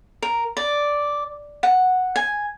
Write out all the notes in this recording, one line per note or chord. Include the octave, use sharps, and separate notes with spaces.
A#4
D5
F#5
G#5